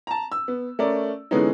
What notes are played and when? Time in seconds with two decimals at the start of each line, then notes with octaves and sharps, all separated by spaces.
0.07 A5 A#5
0.32 E6
0.48 B3
0.79 A3 C#4 A#4 D5
1.31 D3 E3 G#3 B3 C#4 D#4